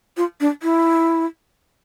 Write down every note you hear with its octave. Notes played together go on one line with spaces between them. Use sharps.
F4
D4
E4